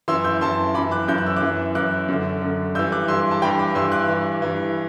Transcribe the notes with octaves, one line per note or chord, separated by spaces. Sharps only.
F#2 E3 C6 E6
E6 G6
F#2 E3 A5 C6
F#2 E3 B5 D6
D6 F#6
F#2 E3 G6
F#6
E6
D6 F#6
F#2 E3
F#2 E3 D6 F#6
F#2 D3
F#2 D3
G2 E3 E6 G6
D6 F#6
G2 E3 C6 E6
A5
G2 E3 G5 B5
B5 D6
G2 E3 C6 E6
D6 F#6
G2 E3
G2 E3